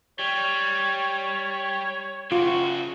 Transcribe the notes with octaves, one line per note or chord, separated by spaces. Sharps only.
G3 C#5
C#3 F4 F#4